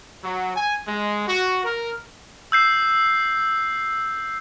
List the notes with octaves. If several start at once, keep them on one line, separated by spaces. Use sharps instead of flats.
F#3
G#5
G#3
F#4
A#4
E6 G6 C7